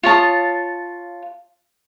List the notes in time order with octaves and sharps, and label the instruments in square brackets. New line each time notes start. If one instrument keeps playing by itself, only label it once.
[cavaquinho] F4 C#5 A5 D#6